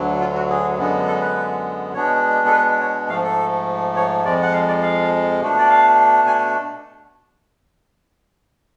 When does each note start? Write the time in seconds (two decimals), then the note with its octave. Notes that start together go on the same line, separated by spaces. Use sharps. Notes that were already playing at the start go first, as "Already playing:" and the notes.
Already playing: D2 D3 F#3
0.21 F4
0.35 F#4
0.50 G#4
0.78 F#2 D3 G#3 B3
1.07 A4
1.22 B4
1.94 B2 G#3 B3 D4 C#5
2.47 A4
2.51 B4
2.81 C#5
3.09 G#2 F3 A3 F5
3.24 A4
3.96 C#5
4.25 F2 F3 G#3 D5
4.42 F#5
4.53 F5
4.68 D5
4.83 F5
5.41 B2 A3 D4
5.58 D5
5.70 F5
6.27 G#5